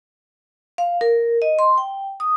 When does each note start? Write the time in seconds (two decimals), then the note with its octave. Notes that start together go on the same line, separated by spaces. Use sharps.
0.78 F5
1.01 A#4
1.42 D#5
1.59 C6
1.78 G5
2.20 D#6